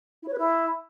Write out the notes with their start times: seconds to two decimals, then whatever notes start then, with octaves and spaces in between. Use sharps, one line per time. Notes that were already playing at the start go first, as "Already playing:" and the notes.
0.22 E4
0.28 C#5
0.33 B4
0.38 E4